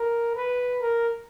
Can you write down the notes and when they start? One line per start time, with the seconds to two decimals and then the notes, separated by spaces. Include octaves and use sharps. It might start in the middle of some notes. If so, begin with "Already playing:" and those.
Already playing: A#4
0.36 B4
0.81 A#4